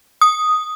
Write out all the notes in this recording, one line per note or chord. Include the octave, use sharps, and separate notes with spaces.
D#6